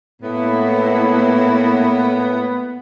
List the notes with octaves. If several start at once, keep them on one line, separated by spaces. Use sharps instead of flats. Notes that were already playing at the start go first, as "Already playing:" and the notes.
A2 A#3 B3 E4